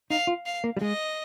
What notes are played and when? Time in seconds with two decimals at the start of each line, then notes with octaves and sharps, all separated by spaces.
0.10 D#4 F5
0.27 F4
0.46 F5
0.64 A#3
0.77 G3
0.81 G#3 D#5